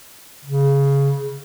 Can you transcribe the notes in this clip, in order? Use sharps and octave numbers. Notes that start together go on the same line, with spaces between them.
C#3